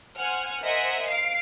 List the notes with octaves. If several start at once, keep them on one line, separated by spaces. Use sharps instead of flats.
C5 F#5 G#5 F6
A#4 C5 D#5 E5 F#5 G#5
F5 C7 D7